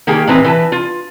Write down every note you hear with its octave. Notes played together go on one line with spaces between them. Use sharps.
D#3 A#3 G4 G#4
A2 D#3 E3 C4 B4 A#5
E3 B4 A5
F4